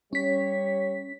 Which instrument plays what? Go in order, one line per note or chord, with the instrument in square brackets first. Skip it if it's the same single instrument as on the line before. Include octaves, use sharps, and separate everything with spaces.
[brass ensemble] G3 C#5 [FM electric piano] C#4 B6